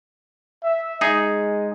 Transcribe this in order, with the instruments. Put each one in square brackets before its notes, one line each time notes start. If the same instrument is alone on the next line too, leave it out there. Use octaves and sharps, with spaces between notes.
[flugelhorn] E5
[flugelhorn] G#3 [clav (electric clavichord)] D#4 G#4